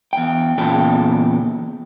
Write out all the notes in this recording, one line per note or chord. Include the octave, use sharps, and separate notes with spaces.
E2 G5
E2 A#2 C#3 A4 G5